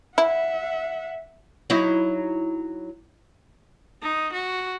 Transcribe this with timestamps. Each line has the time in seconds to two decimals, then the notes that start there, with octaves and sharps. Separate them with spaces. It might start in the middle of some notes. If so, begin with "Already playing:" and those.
0.18 E4 E5 F#5
1.70 F#3 D#4 E4
4.02 D#4
4.33 F#4